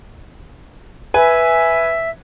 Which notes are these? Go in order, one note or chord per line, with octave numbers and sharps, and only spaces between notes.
B4 E5 G#5